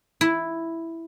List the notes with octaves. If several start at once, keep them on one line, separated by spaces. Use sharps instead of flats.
E4